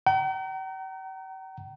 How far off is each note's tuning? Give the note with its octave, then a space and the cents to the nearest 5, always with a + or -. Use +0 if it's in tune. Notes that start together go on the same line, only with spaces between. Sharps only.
G5 -45 A#5 -15